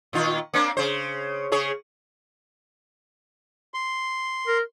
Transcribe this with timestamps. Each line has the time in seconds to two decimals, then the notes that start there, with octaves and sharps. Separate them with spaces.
0.13 A#2 D#3 F4
0.54 A#3 C4 D4
0.77 C#3 C5
1.52 C#3 G#4 C#5
3.74 C6
4.48 A#4